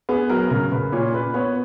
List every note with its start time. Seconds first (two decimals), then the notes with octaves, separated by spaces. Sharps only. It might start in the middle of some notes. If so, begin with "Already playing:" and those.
0.09 B3 G#4
0.30 F#3 A#4
0.50 C#3 A#4
0.71 C#3 B4
0.92 A#2 C#5
1.14 A#2 B4
1.34 B3 C#5